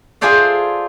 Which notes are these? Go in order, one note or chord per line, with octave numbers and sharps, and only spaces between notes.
F4 G#4 A4 C5 D5 E5